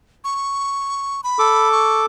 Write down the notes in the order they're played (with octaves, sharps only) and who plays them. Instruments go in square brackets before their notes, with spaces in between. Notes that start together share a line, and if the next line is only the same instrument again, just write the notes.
[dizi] C#6
B5
[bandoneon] A4 D6
[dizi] C#6